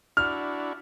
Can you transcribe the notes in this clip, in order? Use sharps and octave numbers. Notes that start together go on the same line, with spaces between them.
D4 E4 F#4 F6